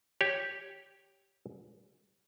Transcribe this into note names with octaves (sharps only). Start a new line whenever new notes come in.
G4 C#5